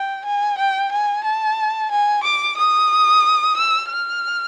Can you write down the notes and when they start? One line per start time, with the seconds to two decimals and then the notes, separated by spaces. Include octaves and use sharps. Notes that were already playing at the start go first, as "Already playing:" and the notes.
Already playing: G5
0.24 G#5
0.58 G5
0.92 G#5
1.24 A5
1.91 G#5
2.23 D6
2.57 D#6
3.57 E6
3.89 F6